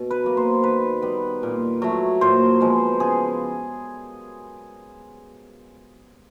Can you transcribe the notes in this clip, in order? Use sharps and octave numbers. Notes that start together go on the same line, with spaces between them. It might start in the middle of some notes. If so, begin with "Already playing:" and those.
Already playing: B2
B4
F#3 A#3
C5
D#3 B4
G3 B3
A#2
F#3 A3
A#2 C5
F3 G#3 B3
C#3 G#4